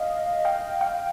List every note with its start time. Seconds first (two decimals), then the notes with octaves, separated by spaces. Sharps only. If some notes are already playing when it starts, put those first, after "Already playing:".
Already playing: D#5 F5
0.45 F5 G5
0.81 F5 G5